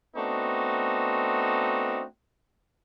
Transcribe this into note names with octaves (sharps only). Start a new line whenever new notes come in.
A3 B3 C4 D4 D#4 F#4